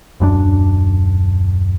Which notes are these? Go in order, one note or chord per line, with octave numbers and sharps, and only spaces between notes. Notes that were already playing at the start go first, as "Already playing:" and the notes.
D#1 F#2 F#3 D4